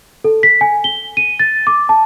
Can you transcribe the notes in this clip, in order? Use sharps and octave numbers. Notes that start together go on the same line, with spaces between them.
A4
B6
G#5
G7
D#7
A6
D6
A5